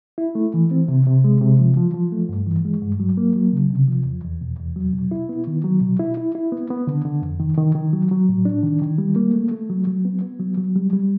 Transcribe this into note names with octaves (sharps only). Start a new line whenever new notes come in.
E4
A3
E3
C4
C3
C3
G#3
C3
F3
F3
F3
A3
G2
E3
G#3
G2
F#3
A#3
F#3
C#3
C3
F3
E2
E2
B2
E2
F#3
B2
E4
B3
D#3
F#3
B2
E4
E4
E4
B3
B3
D3
D3
F2
D#3
D#3
D#3
F#3
F#3
A2
D4
D#3
D#3
G3
A#3
A3
A3
F#3
F#3
B3
B3
F#3
F#3
G3
G3